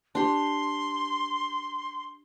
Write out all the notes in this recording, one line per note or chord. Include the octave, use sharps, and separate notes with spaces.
D4 G4 C6